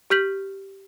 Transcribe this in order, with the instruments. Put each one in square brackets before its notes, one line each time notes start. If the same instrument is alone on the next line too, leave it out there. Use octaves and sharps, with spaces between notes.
[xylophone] G4 F6 G6 B6 F#7